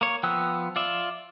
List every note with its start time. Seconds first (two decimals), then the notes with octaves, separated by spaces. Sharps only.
0.01 A#3 C#5
0.23 F3 B3 G5 E6 F#6
0.76 F4 D5 E5